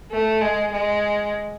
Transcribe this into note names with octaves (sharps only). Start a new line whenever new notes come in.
A3
G#3
G#3